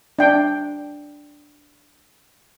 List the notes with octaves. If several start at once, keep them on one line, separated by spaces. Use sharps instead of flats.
D4 G5